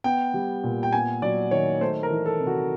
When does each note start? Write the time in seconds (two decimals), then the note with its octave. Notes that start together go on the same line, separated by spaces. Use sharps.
0.04 B3 G5
0.34 G3
0.64 A#2
0.83 G5
0.93 B3 G#5
1.22 F#3 D5
1.51 D#3 C#5
1.81 A3 C5
2.03 A#4
2.10 E3
2.26 A4
2.39 C3
2.47 F#4